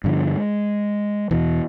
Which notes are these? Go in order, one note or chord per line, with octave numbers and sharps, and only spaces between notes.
G2 D3 F3
G#3
E2 B2 E3